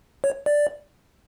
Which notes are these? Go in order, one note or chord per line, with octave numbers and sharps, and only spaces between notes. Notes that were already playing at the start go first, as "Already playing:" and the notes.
C#5
D5